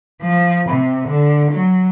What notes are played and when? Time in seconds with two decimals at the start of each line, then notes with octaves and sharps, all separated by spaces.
0.22 F3
0.69 C3
1.07 D3
1.51 F#3